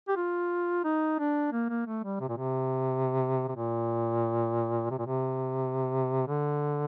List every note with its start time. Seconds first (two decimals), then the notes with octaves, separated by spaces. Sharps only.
0.08 G4
0.16 F4
0.84 D#4
1.19 D4
1.52 A#3
1.69 A#3
1.86 A3
2.03 G3
2.20 C3
2.28 A#2
2.37 C3
3.48 C3
3.56 A#2
4.91 C3
4.98 A#2
5.06 C3
6.27 D3